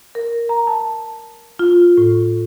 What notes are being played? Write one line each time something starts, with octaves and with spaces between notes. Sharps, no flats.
A#4
A#5
A5
F4
A2